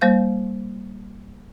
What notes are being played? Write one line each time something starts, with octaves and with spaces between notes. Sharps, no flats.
G3 A#3 C5 F5 G6